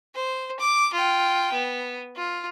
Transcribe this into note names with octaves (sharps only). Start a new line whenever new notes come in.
C5
D6
F4 G5
B3
F4